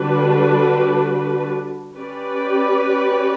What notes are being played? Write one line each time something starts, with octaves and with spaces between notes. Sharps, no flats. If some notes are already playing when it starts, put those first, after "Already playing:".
Already playing: D3 G3 D4 F#4 B4
C#4 G4 B4 D5